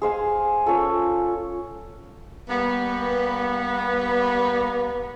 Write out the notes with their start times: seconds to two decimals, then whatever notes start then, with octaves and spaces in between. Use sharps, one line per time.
0.02 G#4 C5 F5 G#5
0.66 C#4 F4 A4
2.49 G3 A#3 B3